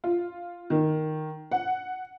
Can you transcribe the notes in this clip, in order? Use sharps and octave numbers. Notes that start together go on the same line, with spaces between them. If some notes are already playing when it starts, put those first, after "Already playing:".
F4
D#3
F#5